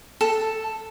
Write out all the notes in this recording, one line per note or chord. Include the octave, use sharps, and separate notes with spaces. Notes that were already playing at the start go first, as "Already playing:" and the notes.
A4